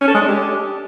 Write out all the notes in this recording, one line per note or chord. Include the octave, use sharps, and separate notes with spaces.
C#4
A4
G#3
D4
G4